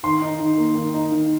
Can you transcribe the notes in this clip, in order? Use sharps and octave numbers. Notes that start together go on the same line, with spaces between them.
D#3 C6
D#4
D#3
A#3
D#3
D#4
D#3